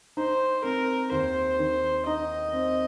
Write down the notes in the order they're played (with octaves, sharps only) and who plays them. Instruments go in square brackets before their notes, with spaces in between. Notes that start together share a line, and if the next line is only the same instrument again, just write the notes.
[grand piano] D#4 [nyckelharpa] C5
[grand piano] C4 [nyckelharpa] A#4
[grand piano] D#2 [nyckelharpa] C5
[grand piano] D#3
[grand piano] D#4 [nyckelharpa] D#5
[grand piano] C4